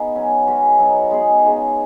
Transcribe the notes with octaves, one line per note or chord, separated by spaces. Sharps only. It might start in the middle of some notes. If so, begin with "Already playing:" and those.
Already playing: B3 D#4 G#4
F#3 C#4 B4
G#3 C#4 F#4 B4
F#3 D#4 B4
G#3 B3 G#4
C#3 G#3 D#4